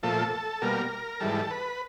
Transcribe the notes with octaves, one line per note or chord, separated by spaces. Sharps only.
A#2 F3 A3 A4
B2 G3 A#3 A#4
G#2 E3 G3 A4
B4